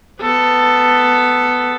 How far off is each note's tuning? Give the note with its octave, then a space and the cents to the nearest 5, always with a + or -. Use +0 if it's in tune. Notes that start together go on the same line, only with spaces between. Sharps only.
B3 +10 A4 +5